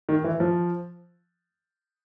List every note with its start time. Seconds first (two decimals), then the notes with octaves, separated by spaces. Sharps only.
0.09 D#3
0.24 E3
0.40 F3